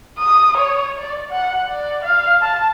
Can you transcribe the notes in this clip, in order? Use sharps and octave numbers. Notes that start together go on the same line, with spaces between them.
D#6
C#5
D5
F#5
D5
F5
A5